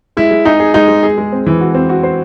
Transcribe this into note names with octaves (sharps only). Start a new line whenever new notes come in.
G#3 E4
G#3
D#4 G#4
G#4
G#3 D#4
G#3
G#4
G#3
C4
E3
F#4
C4
F#4
C5